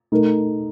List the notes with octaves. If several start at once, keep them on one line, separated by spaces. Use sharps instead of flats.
A3 D#4 A#4